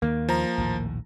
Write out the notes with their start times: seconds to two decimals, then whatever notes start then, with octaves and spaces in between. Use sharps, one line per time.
0.02 D#2 D#3 A#3
0.29 F3 A#5
0.58 A#1 D#2 A2